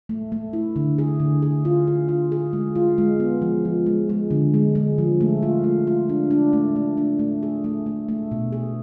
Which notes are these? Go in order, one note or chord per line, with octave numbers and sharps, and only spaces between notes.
A3
A3
E4
D3
G#4
D3
G#4
F4
G#4
F4
G#4
G#3
F4
G#3
B3
F3
F3
G#3
G#3
D3
G#3
G#3
F3
A3
F4
A3
F4
D4
D4
A3
A3
D4
A3
G#4
A3
A3
A3
B2
G#4